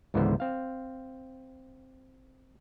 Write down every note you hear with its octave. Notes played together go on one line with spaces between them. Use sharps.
C#2 G#2 D3 E3 B3 C5
C4 F5